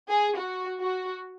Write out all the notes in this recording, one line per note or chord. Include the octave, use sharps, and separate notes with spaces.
G#4
F#4
F#4